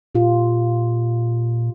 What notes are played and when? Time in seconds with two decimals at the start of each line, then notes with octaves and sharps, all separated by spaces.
0.15 A#2 F4 G4